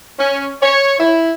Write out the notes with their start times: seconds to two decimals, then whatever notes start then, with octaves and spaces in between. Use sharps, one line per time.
0.18 C#4
0.62 C#5
0.99 E4